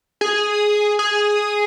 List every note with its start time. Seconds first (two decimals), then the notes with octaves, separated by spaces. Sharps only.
0.21 G#4
0.99 G#4